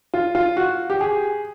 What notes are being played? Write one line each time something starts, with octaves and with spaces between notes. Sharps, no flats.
F4
F4
F#4
G4
G#4